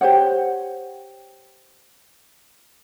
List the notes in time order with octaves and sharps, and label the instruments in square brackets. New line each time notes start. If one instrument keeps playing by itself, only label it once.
[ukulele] G4 C5 C#5 F#5